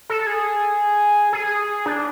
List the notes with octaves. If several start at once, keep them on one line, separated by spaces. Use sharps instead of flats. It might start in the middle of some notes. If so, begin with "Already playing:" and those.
A4
G#4
G#4
D4